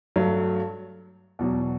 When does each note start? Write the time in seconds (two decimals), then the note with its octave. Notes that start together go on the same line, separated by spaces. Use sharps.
0.16 G2 F#3 A3
1.39 E2 B2 F#3